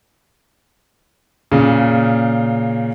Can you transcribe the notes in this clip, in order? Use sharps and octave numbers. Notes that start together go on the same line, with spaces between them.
A#2 C#3